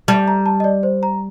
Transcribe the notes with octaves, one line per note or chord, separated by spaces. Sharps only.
G3 A5
A#5
A5
D#5
D5
C5
A#5